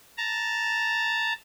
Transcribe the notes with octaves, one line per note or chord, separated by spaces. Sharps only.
A5 A#5